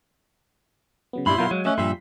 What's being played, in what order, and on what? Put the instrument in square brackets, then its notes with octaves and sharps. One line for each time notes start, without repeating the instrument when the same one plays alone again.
[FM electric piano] C#3 F#3 B3
[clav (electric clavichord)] G2 G3 [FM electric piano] A#2 [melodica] E4 C6 [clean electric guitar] B5
[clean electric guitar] B2 F#3 [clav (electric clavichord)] F4 A#4 F#5 [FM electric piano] F5 G6
[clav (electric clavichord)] F#3 [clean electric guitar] G#3
[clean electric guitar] A3 [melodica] C#4 [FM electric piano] D#5 E5 F#6
[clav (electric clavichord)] G2 [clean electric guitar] A#2 F3 G3 [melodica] E5 [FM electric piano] C6 B6